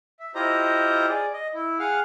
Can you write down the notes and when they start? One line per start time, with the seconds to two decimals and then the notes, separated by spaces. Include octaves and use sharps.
0.20 E5
0.35 E4 F4 G4 C5 D#5 A#5
1.09 G#4 D5
1.34 D#5
1.54 E4
1.79 G#4 F5 F#5 F6